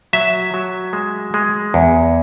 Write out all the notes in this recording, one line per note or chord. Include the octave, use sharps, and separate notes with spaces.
F#3 E5
F#3
G#3
G#3
E2